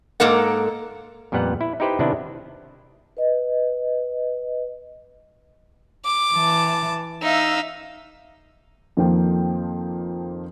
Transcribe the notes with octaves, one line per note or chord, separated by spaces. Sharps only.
G#2 A#3 A4 A#4 F#5
F2 A#2 G3 B3 F#5
E4
D#4 E4 G4 B4 C5
C3 D#3 B3 D4 E4
B4 D#5
D6
E3 A5
D#4 E5 F5 E6
F2 D#3 F3 A#3 G5